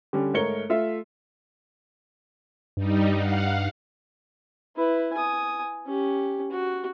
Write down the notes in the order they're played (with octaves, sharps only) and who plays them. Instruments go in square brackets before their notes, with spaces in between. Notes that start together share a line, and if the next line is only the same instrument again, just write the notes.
[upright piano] D3 G3 C#4
G#2 A3 A#4 C#5 C#7 G7
A3 F4 E5
[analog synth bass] G2 [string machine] G3 D#4
[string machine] F5 F#5
[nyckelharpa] E4 B4
G#5 D#6
C#4 G4
F#4